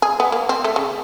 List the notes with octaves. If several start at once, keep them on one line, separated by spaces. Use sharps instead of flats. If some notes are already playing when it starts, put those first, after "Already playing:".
G#4
B3
A#3
C4
A3
C#3